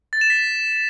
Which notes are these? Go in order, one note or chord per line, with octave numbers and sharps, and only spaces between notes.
A6
E7
B6